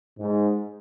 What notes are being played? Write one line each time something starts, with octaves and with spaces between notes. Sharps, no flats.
G#2